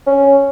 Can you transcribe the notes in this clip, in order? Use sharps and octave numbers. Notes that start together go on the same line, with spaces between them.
C#4